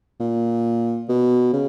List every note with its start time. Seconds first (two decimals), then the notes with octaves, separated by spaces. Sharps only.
0.20 A#2
1.08 B2
1.53 C#3